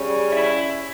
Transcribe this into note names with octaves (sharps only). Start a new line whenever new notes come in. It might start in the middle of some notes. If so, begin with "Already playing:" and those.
Already playing: C#3 G3 C#4
E4